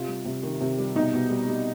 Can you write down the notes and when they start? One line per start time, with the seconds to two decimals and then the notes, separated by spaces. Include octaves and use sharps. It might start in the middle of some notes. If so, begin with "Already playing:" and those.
Already playing: C3 F4
0.08 G3
0.25 C3
0.43 D#3
0.61 C3
0.79 G3
0.95 B2 D#4
1.13 B2
1.30 G3
1.48 G3